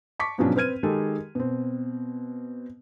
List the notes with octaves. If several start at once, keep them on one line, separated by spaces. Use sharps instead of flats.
A5 C#6 D6 B6
G#2 B2 F3 F#3 C#4 D4
C4 B4 F6 G#6 D#7
D#3 G#3 G4 A4
B2 C4